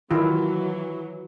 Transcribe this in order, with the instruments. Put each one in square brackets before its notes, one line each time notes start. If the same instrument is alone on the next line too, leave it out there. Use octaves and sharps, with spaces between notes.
[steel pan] D#3 E4 F4 [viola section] E3 F#3